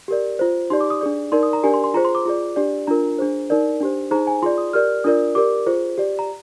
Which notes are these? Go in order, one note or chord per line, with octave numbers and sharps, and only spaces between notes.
G4 A#4 D5
F4 C5
D#4 G4 D5 C6
D6
D#6
D4 G#4 D5
D#4 A#4 D5 C6
D#6
A#5
D4 G4 A#4 D5 G#5
C6
C6
F4 G#4 C5 A#5
C6
D6
F4 G#4 D5
D4 G4 D5
D4 F4 A#4 A#5
D4 G#4 C5
D#4 A#4 D5
D4 G4 C5
D#4 G#4 C5 A#5
G#5
F4 G#4 D5 C6
D#6
G4 A#4 D5 F6
D4 F4 A#4 D5 D#6
G4 A#4 D5 D6
F4 G#4 C5
G4 D5
A#5